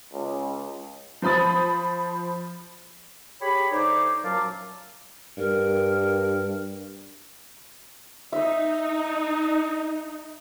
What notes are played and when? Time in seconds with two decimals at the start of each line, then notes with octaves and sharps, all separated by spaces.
0.14 C#2
1.22 F3 C5 B5 D#6 A6
3.41 G4 G#4 C#5 B5
3.71 D3 A3 D#4 C5 C#5 D6
4.24 F#2 A#2 F#3 F5 A5 D6
5.38 G2 A#4
8.32 D#4 E5